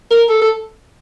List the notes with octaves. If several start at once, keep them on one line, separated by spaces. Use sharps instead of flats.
A#4
A4
A4